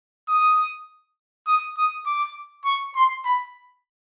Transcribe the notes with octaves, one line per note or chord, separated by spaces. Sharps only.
D#6
D#6
D#6
D6
C#6
C6
B5